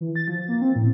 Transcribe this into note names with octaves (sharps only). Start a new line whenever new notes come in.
E3
A6
F3
A#3
C4
A2